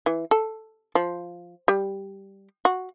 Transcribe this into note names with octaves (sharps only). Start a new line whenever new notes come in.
E3
A4
F3
G3
F#4